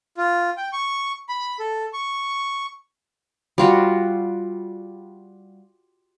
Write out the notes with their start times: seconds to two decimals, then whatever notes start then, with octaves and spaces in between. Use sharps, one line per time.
0.17 F4
0.57 G5
0.73 C#6
1.29 B5
1.59 A4
1.93 C#6
3.58 G3 F4 F#4